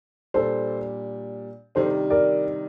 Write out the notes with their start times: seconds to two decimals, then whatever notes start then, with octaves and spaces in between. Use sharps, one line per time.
0.34 A#2 G3 D4 A4 C5
1.75 C3 D#3 G3 D4 A4 C5
2.10 A#4 D5